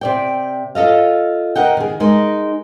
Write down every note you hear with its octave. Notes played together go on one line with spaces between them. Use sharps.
C3 D5 G5
F4 A4 D#5 F5
A#4 D#5 F#5 G5
D#3 G#4
G#3 D#4 A#4